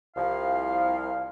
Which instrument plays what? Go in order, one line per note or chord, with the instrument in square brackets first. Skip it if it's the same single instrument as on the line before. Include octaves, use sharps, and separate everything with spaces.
[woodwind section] C2 F3 F5